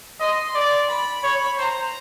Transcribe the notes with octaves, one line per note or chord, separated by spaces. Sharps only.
D#5 C6
D5
B5
C#5
C5 A#5